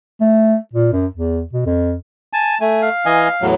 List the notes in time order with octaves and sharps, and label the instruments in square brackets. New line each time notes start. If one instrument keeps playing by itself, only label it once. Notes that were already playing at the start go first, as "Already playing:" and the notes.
[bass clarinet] A3
A#2
F#2
E2
B2
F2
[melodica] G#5 [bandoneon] A5
[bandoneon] A3 [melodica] G#5
[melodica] F5
[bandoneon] E3 D#5 G#5
E2 A2 F#3